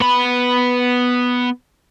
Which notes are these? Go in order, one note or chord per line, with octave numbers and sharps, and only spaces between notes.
B3 B5